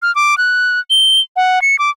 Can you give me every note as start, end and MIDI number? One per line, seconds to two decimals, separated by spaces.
0.02 0.14 89
0.15 0.37 86
0.38 0.80 90
0.90 1.20 103
1.36 1.62 78
1.62 1.78 97
1.79 1.90 86